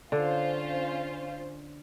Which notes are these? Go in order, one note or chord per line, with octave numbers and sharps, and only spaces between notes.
D3 C#4 F4 C5